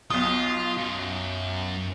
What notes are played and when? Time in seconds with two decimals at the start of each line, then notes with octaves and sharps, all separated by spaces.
0.10 B1 F4 D#6
0.77 F#2